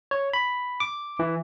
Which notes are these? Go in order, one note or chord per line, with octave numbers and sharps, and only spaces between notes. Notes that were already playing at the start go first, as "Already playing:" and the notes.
C#5
B5
D6
E3